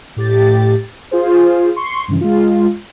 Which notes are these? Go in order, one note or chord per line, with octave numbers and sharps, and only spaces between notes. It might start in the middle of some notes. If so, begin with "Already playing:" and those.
A2 G4 A6
F4 G#4 C5
C6 C#6
G2 C#3 E3
G#3 F4